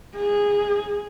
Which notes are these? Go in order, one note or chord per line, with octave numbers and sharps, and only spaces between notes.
G#4